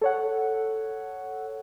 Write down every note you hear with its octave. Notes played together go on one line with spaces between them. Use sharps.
A4 C#5 F#5